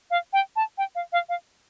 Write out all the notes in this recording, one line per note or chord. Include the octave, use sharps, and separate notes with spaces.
F5
G5
A5
G5
F5
F5
F5